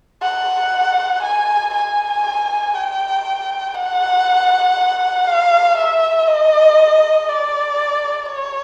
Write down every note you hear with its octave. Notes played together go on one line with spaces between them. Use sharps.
F#5
G#5
G#5
G5
F#5
F5
E5
D#5
D5
C#5